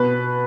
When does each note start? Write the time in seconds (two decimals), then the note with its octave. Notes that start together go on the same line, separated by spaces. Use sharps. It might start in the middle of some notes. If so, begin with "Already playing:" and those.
Already playing: B2 B4